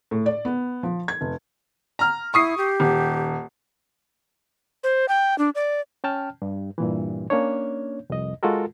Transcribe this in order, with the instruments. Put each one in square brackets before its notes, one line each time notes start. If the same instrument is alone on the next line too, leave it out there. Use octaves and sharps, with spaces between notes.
[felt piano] A2
D5
B3
F3
G#6
F1
[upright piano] A#5 F6
[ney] E4 [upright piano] C#6 D#6 C7
[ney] G4
[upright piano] D#1
[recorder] C5
G5
D4
D5
[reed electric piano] C#4 G5 A5 F6
G2
G2 A#2 E3
A#3 C#4 D4 C#5
C2 F2 D#5
G#3 F4 F#4 A4 A#4